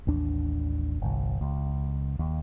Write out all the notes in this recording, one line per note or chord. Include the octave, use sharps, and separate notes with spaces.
A1 D#2 D4
G1 C2
C#2
D#2